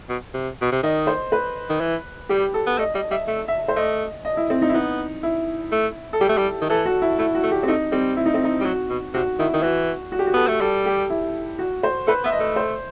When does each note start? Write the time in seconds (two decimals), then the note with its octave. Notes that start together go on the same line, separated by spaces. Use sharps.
0.09 B2
0.34 C3
0.62 B2
0.72 C3
0.83 D#3 D#5
1.07 C5
1.32 B4
1.70 D#3
1.81 E3
2.29 G3 G4
2.54 A4
2.67 B3
2.78 A3 D#5
2.94 G3 D#5
3.11 G3 E5
3.27 A3 E5
3.48 E5
3.68 C5
3.76 A3 D#5
4.25 D#5
4.37 E4
4.50 C4
4.62 D#4
4.69 E4
4.74 B3 D#4
5.23 E4
5.72 A3
6.13 A4
6.21 G3 G4
6.29 A3
6.38 G3
6.62 D#3
6.70 E3 A4
6.85 F#4
7.02 E4
7.18 A3 E4
7.35 F#4
7.43 A3
7.51 G4
7.63 C4
7.68 A3 D#4
7.92 G3 C4
8.17 E4
8.26 D#4
8.34 C4
8.44 D#4
8.61 G3
8.65 F#3 F#4
8.90 B2
9.14 C3 F#4
9.39 D#3 E4
9.54 D#3
9.63 E3 F#4
10.12 F#4
10.19 G4
10.27 F#4
10.34 B3 A4
10.48 A3
10.61 G3 A4
10.86 G4
11.10 E4
11.59 F#4
11.83 C5
12.07 A3 B4
12.24 B3 E5
12.32 D#5
12.40 A3
12.56 C5